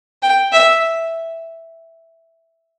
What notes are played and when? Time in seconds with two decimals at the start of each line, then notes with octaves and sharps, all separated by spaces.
0.23 G5
0.53 E5